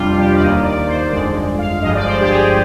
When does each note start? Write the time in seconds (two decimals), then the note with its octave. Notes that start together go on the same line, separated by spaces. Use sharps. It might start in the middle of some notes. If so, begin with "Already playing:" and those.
Already playing: F2 C3 G3 D4 F4
0.17 G4
0.34 D5
0.40 D#2 D#3 A#3 D#5
0.63 D5
0.87 C5
1.11 G1 F2 D3 G#3 D5
1.58 F5
1.81 G1 G2 F3 G#3 D#5
1.95 D5
2.05 C5
2.21 G4
2.29 G#4